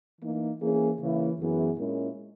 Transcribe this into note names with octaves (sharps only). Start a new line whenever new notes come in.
E3 A#3 D#4
E3 A#3 C#4 G#4
C#3 E3 A#3 E4
F#2 E3 B3 E4 G#4
A#2 G#3 C#4 E4 A#4